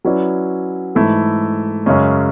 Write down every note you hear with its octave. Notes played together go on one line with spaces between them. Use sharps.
F#3 C#4 E4 B4 D5
G#2 E3 A3 E4
F#2 C#3 G#3 C#4